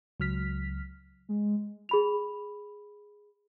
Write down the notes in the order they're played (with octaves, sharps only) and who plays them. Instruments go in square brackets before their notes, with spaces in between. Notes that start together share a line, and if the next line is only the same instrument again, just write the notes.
[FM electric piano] C#2 F#3 F6 B6
[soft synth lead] G#3
[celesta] G#4 B5 F7